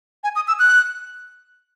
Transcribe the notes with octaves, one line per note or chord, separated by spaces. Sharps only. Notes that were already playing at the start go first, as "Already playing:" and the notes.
G#5
D#6
E6
F#6